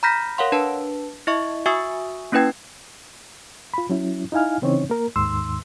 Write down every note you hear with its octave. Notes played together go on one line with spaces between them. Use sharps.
A#5 B5 F6 G6 A#6 B6
A#4 C#5 F5 F#5 C6
D4 B4 A5
E4 D#5 E5 C#6
F#4 E5 G#5 C#6 D#6 E6
A#3 C#4 E4 B4 G5 G#6
F4 B5
F#3 C#4 E4
D#4 E4 F5 G#5 F6
C#3 E3 C4 C#4 D#4 C#5
A#3 A#4
D#2 G#2 D#3 C6 E6